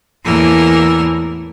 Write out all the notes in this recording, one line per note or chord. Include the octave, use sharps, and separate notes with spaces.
E2 A2 E3 A#3 A#4 E6